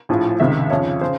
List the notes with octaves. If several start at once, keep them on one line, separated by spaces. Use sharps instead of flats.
A#1 A2 F3
C#2 C3 D#3 E5
F2 C#3 F3 C#5
C#3 C5